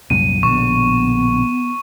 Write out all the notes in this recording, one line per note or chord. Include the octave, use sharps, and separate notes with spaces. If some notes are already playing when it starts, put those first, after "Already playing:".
C2 F#2 A#2 D#7
A#1 B2 D3 B3 C#6